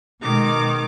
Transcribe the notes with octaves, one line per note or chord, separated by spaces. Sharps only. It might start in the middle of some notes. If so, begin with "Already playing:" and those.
B2 D#3 G#3 D6